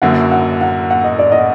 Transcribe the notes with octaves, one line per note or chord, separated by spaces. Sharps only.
F#1 F#2 D3 F#3 A#3 F#5
F#5
F#5
F#5
D#5
D5
D#5